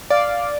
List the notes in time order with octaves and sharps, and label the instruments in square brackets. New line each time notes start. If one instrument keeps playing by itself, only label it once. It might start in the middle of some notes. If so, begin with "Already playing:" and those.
[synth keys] D5 [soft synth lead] F5